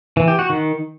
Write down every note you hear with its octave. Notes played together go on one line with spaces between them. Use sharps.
E3
G4
F#4
D#3